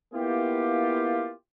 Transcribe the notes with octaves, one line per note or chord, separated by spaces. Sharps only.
A#3 B3 E4 F4 G4